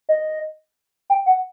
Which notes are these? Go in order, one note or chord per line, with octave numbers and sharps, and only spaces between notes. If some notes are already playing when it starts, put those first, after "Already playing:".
D#5
G5
F#5